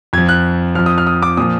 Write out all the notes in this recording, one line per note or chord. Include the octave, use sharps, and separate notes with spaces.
F2 F3 G#6
F#6
F2 F3 F6
D#6
F6
D#6
D6
A#2 F3 D#6